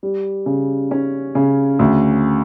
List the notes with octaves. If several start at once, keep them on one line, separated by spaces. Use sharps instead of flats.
G3
C#3
C#4
C#3
D2